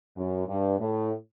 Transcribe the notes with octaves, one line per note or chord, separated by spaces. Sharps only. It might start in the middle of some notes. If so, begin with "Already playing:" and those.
F#2
G2
A2